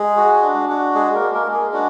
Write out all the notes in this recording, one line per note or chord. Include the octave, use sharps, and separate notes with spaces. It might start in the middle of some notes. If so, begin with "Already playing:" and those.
Already playing: G#3 G#4
F#4
D4
F#4
G#3 G#4
A#3 A#4
G#3
A#3 A#4
G#3
G#4
D4 F#4